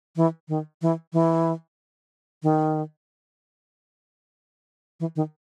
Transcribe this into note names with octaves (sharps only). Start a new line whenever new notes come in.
E3
D#3
E3
E3
D#3
E3
D#3